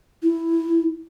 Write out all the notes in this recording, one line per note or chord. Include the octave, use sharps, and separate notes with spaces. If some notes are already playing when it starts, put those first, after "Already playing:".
E4